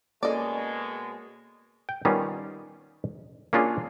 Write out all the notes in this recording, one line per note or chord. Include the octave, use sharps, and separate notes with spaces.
B2 G#3 A#3 C#4 A4 D5 D#5
G5
D#3 G3 B3 C#4 F4
A#3 C#4 D4 F4 G#4